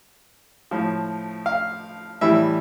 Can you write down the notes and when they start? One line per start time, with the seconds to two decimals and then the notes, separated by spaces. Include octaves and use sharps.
0.71 A2 F3
1.46 F5
2.21 A2 E3 G3 E5